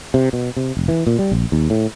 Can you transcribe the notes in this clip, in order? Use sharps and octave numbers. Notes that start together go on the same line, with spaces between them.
C3
B2
C3
F1
E3
A#2
G3
A#1
D#2
A2